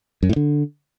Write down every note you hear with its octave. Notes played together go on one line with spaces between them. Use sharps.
F#2
A2
D3